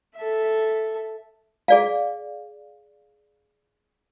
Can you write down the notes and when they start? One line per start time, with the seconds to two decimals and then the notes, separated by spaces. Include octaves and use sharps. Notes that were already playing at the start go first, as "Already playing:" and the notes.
0.16 A4 E5
1.68 G#4 D5 F5